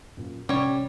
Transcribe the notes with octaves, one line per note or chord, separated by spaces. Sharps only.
F#2 A#2
A1 C3 G3 C#4 C#5